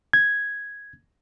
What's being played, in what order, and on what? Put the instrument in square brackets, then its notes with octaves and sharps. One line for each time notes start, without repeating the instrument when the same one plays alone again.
[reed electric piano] G#6